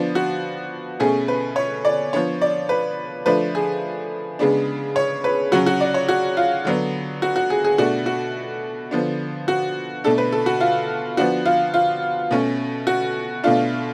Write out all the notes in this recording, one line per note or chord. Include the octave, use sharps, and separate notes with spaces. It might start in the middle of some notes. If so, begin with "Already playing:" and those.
Already playing: F3 B3 D4
F#4
B2 A3 C#4 G#4
B4
C#5
D5
F3 B3 D4 C#5
D5
B4
F3 A3 D4 B4
G#4
C#3 G#3 B3 D4
C#5
B4
C#3 F#3 C#4 F#4
F#4
D5
C#5
F#4
F4
D3 F#3 B3 D4
F#4
F#4
G#4
G#4
B2 A3 D4 F#4
F#4
D3 F3 B3 D4
F#4
B2 A3 D4 A4
B4
A4
F#4
F4
F3 B3 D4 F#4
F4
F4
B2 A3 C#4
F#4
B2 A3 D4 F4